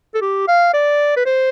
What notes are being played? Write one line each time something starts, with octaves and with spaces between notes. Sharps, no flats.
A4
G4
F5
D5
B4
C5